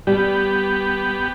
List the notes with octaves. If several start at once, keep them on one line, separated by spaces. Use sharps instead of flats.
G3 B3 G4